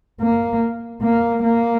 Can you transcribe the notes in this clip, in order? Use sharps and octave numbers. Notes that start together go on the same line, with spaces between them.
A#3
A#3
A#3